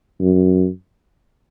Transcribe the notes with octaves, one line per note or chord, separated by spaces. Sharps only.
F#2